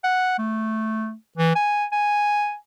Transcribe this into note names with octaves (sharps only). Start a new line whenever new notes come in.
F#5
A3
E3
G#5
G#5